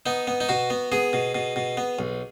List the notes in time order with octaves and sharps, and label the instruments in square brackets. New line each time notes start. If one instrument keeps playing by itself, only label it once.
[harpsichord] B3 D#4
B3
D#4
B2 F#4
B3
B3 G#4
B2
B2
B2
B3
B1